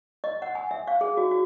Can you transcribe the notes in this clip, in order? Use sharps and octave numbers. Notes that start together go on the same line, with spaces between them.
D#5
F#5
G#5
E5
F5
G#4
F#4
F#4